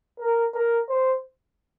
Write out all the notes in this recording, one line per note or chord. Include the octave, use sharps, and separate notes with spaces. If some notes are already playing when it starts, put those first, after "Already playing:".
A#4
A#4
C5